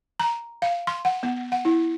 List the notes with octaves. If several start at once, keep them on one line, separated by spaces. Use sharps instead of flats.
A#5
F5
C6
F#5
B3
F#5
E4